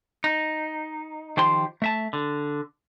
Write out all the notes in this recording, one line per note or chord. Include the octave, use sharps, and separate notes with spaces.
D#4
D#3 F3 G4 C5 C6
A3 E5 A5
D3